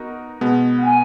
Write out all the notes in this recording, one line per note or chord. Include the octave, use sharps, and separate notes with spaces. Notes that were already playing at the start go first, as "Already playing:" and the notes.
Already playing: B3 D#4 F#4 A#4
B2 G#3 B3
F#5
G#5